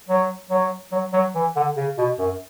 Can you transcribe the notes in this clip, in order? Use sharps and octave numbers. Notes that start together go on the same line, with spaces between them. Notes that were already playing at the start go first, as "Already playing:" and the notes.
F#3
F#3
F#3
F#3
E3
D3
C#3
B2
F#2